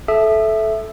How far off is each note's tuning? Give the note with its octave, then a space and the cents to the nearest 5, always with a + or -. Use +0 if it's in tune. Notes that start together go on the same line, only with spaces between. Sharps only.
A4 -20 E5 +0 D#6 -40